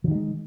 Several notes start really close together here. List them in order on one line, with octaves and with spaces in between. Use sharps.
E3 D#3 G3 G#3